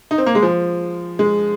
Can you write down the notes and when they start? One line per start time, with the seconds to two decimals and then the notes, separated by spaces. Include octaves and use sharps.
0.11 D#4
0.18 C4
0.26 A#3
0.35 G#3
0.43 F3
1.19 G#3